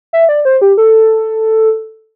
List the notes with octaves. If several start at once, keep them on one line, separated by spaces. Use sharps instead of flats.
E5
D5
C5
G4
A4